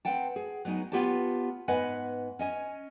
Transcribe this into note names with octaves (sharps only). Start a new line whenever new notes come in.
C4 B4 F#5 G5 A5
G#4
F#3 G#3 B3 C#4 D#4
B3 F4 G4 C#5 A5
G#2 B3 B4 D#5 F#5 G#5
C#4 D#5 G#5